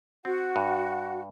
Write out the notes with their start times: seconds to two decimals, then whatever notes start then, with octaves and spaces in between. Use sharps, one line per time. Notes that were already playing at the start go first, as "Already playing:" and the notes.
0.25 C4 F#4 F#5
0.56 G2